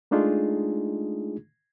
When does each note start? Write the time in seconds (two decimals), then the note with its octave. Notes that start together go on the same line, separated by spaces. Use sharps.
0.11 G#3 A3 D4 D#4 F4 G#4